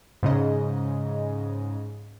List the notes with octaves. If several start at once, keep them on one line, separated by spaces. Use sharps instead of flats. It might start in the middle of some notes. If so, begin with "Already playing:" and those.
G#2 C#3 D#5